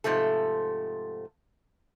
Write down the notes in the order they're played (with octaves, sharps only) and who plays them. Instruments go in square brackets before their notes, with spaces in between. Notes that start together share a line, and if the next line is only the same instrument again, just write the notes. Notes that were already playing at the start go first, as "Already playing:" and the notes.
[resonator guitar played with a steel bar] G#2 C3 F3 A3 A4